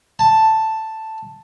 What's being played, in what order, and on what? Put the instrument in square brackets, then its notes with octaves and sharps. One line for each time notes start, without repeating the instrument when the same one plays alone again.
[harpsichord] A5